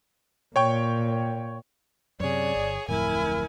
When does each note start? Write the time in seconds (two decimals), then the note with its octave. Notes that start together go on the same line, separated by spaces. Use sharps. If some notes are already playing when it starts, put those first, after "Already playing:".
0.56 A#2 C#5 G5 C#6
2.20 F#2 C3 G#4 C#5 D5
2.55 G1
2.88 D1 F2 A2 E4 A#4 G#5